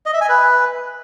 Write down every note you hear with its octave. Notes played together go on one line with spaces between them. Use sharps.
D#5
E5
G#5
B4